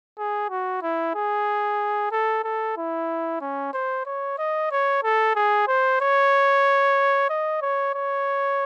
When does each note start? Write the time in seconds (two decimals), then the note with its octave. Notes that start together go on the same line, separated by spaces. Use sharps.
0.18 G#4
0.50 F#4
0.82 E4
1.15 G#4
2.12 A4
2.44 A4
2.77 E4
3.41 C#4
3.73 C5
4.06 C#5
4.38 D#5
4.71 C#5
5.03 A4
5.35 G#4
5.67 C5
6.01 C#5
7.29 D#5
7.61 C#5
7.94 C#5